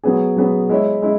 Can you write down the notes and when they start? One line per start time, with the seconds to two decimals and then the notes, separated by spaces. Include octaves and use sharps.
0.04 F#3 B3 G#4
0.37 F#3 B3 G#4
0.69 G#3 E4 C#5 E5
1.02 G#3 E4